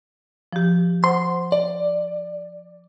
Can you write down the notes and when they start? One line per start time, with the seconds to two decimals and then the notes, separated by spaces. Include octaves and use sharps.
0.53 F3 G4
1.04 C5 F#5 C6
1.52 D5